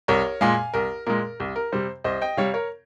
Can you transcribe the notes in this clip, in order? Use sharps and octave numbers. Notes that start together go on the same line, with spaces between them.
C2 A#4 C#5
A#2 G#3 F5 G#5
C2 A#4
A#2 G#3 A#4
C2
A#4
C3 G3 C5
C2 C5 D#5
D#5 G5
C3 G3 C#5 F5
A#4 C#5